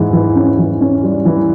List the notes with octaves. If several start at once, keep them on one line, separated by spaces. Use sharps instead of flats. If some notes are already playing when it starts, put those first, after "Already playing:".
Already playing: G#2 E3
E3
C#4
E3
C#4
G3
E3